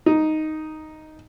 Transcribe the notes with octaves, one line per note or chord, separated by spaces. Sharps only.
D#4